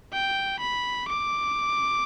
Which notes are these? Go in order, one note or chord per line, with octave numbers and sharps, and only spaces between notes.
G5
B5
D6